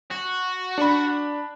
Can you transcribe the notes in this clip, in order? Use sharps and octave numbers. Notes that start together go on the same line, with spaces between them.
F#4
D4 B5